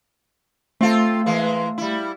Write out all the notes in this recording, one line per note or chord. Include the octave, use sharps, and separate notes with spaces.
A3 C4 F4 A4
E3 G#3 A#3
G3 E4